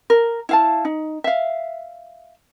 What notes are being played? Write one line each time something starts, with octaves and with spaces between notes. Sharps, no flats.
A#4
E4 F5 A5
D#4
E5 F5